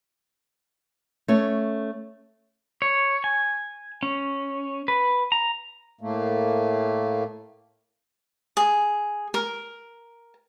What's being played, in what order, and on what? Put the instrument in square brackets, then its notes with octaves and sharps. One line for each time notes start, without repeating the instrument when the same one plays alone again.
[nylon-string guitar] A3 C#4 C#5
[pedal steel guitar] C#5
G#5
C#4
B4
A#5
[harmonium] A2 A3 A#3
[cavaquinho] G#4
A#4